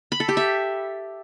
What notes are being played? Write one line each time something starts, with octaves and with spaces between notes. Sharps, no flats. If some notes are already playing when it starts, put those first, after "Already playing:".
B5
A4
G4
E5